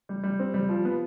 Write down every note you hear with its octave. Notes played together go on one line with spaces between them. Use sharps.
G3
G3
C4
G3
F3
B3